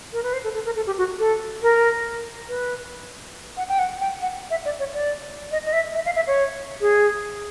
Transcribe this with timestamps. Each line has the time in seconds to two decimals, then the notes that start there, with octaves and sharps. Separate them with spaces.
0.13 A#4
0.23 B4
0.33 C5
0.44 A4
0.55 A4
0.65 A#4
0.76 A4
0.87 G4
0.98 F#4
1.19 A4
1.63 A#4
2.49 B4
3.57 F#5
3.69 G5
3.79 F#5
4.00 G5
4.22 F#5
4.51 E5
4.65 D5
4.79 C#5
4.94 D5
5.52 D#5
5.66 D#5
5.73 E5
5.95 E5
6.05 F5
6.16 E5
6.27 C#5
6.81 G#4